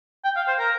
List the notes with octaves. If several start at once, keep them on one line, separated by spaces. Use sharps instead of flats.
G5
F5
C5
A#4